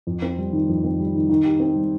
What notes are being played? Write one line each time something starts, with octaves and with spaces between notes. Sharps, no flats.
F2
C4
G3
D#3
F2
C4
G3
D#3
D#3
G4
C4
G3